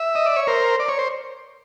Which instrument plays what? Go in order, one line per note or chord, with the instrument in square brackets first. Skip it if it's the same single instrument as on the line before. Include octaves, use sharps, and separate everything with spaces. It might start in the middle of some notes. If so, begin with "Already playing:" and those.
Already playing: [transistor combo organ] E5
D#5
D5
C#5
A#4 C5
D5
C#5
C5